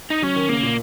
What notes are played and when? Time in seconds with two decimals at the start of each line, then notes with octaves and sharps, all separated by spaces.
0.10 D#4
0.22 F#3 C#4
0.36 D#3
0.49 C#3 A#3
0.63 A#2